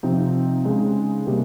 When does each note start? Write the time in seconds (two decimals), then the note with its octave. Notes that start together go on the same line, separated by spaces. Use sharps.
0.03 C3 F3 C4 D#4
0.65 C#3 G#3 D#4
1.27 C3 G3 A#3